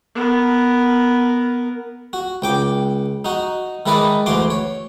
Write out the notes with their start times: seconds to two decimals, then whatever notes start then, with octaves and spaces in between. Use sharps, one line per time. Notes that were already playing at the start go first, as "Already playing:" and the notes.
0.15 B3 A#4
2.13 F#4
2.42 C#2 G5 D6
3.25 D#4 F#4
3.86 D#3 G#3 E4 B4 D5 D#5
4.26 D2 E3 F#4 C6 D6
4.50 C#5